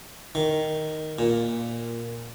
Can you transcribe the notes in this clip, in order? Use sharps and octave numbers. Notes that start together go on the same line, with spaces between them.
D#3
A#2